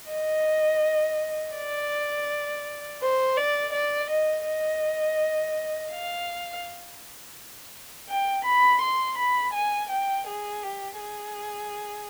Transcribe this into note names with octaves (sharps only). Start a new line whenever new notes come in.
D#5
D5
C5
D5
D5
D#5
D#5
F5
G5
B5
C6
B5
G#5
G5
G#4
G4
G#4